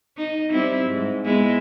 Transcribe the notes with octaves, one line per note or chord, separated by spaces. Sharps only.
D#4
G3 C4 E4
G#2
G#3 B3 E4